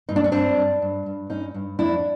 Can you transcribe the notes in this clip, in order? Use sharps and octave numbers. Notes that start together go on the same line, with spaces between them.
G2 D#4
D4
C#4
G2 C4 D4
G2
G2
G2
G2 C#4 D#4
G2
F2 D4 E4